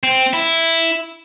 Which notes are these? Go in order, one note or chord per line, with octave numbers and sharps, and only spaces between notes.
C4
E4